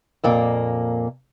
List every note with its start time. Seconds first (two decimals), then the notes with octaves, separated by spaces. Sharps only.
0.24 F2 A#2 A#3